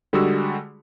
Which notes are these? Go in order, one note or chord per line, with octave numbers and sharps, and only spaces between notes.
D3 G3 G#3 F#4 G#4 E6